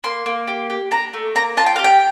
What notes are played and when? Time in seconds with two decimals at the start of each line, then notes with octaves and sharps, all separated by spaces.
0.04 A#3 C6
0.26 A#3
0.48 G4
0.70 G4
0.91 D4 A#5
1.13 A3
1.35 A#3 A#5
1.57 F4 A5
1.66 G5
1.76 G4 F5
1.84 G5